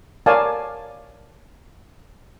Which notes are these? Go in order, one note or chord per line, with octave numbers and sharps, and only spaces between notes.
A#4 C#5 D5 F5 G#5 A5